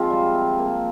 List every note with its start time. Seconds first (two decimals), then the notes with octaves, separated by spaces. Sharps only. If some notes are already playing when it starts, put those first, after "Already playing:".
Already playing: F3 G#3 C4 F4
0.10 G3
0.34 C3
0.58 A#3